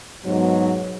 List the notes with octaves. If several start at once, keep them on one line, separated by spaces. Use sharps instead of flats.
G#2 B2 F#3